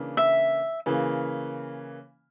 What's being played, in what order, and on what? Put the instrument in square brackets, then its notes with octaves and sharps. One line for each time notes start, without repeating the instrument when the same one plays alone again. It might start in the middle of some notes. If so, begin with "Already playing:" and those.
Already playing: [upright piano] C#3 E3 A#3 D4
[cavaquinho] E5
[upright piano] C#3 E3 A#3